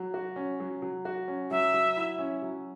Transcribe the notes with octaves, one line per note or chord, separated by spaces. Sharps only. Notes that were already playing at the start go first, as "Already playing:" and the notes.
Already playing: F#3
F#4
C#4
F#3
F#3
F#4
C#4
F#3 E5
F#3
E4
C#4
F#3